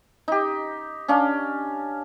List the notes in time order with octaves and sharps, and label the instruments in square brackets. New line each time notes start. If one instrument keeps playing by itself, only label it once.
[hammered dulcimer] D#4 G4
C#4 D4 F5